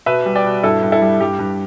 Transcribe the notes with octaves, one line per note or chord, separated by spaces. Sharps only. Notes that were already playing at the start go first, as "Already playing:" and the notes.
B2 B4 E5
G3
D5 G5
B2
G2 E4 A4
G2
E4 A4
G3
G2 G4
G2